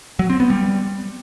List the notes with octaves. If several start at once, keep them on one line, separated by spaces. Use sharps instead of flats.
F#3
C4
B3
G3